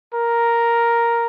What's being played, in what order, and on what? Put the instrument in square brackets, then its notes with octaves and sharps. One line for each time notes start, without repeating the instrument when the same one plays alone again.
[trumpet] A#4